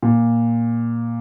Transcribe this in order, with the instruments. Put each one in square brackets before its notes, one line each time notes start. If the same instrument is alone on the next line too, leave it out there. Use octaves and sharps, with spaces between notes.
[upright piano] A#2